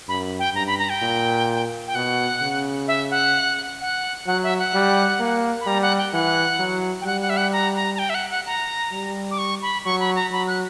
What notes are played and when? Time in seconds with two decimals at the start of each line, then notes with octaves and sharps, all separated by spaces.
0.09 F#2 B5
0.39 G5
0.55 G2 A#5
0.67 B5
0.79 A#5
0.90 G5
1.02 A#2
1.87 G5
1.95 B2 F#5
2.42 C#3
2.88 E5
3.11 F#5
3.81 F#5
4.27 F#3 F#5
4.43 E5
4.59 F#5
4.74 G3
5.20 A#3
5.61 B5
5.66 G3 A#5
5.82 F#5
5.98 G5
6.13 E3 F#5
6.59 F#3
7.01 G5
7.06 G3 F#5
7.22 F#5
7.30 E5
7.37 F#5
7.53 A#5
7.76 A#5
7.94 A#5
7.99 G5
8.10 E5
8.15 F#5
8.30 F#5
8.46 A#5
8.92 G3
9.31 D6
9.38 C#6
9.62 B5
9.85 F#3 C#6
10.00 B5
10.16 A#5
10.31 F#3 B5
10.47 F#6